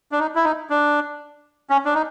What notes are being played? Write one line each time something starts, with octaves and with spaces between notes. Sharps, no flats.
D4
D#4
E4
D#4
D4
C#4
D4
D#4